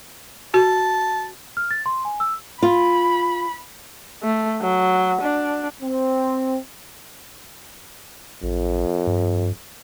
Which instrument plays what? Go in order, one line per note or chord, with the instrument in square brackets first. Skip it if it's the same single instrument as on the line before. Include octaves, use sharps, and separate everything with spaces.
[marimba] F#4 [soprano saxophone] A5
[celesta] F6
A6
C6
G#5
E6
[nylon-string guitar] F4 [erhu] B5
[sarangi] A3
F#3
D4
[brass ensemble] C4
[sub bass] A1 [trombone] F2
[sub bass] G2